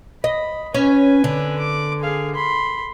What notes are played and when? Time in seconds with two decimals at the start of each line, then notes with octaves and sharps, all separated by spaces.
0.24 D#5 B5
0.74 C#4 B4 G#5
1.24 D3
1.59 D6
2.01 G#4 F5
2.35 B5 C6